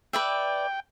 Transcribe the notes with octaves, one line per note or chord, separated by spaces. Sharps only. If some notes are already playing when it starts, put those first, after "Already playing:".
B4 D5 E5 G5